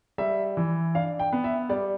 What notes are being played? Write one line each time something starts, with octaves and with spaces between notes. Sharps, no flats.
G3 E5
E3
D4 F5
G5
B3
E5
G3 D5